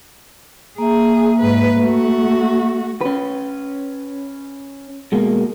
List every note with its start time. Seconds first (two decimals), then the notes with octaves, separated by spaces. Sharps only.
0.78 A#3 G#4 E5
1.40 G#2 B4
1.79 A3 F#4
3.01 C#4 B4
5.12 B2 G#3 A#3